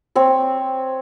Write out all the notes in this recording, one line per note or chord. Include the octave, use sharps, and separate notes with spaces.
C4 C#5